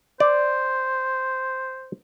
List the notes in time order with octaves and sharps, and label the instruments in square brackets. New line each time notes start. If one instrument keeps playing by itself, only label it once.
[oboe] C5 [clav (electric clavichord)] D5